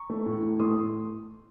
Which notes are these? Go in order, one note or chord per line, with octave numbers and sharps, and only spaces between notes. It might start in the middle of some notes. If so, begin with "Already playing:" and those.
Already playing: A#5 C#6
A3
A2
A2
A3 C6 D#6